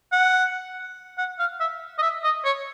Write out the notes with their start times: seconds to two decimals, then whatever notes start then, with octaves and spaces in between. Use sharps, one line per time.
0.12 F#5
1.18 F#5
1.39 F5
1.60 E5
1.98 D#5
2.02 E5
2.24 D#5
2.45 C#5